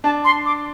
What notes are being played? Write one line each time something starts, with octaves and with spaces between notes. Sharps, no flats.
D4 A5
C6
D6